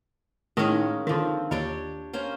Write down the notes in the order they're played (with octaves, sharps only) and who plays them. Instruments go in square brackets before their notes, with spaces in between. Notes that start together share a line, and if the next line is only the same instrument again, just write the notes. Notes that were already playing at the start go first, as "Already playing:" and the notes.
[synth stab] A2 D#3 [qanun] G#3 A#3 C#4
[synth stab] D3 D#3 [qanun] F3 C4
[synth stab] D#2 [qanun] D4 G4 C#5
[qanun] A#3 C#4 C5